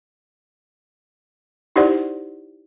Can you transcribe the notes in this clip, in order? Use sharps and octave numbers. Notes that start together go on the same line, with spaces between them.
D#4 E4 G4 C5 D5 F#5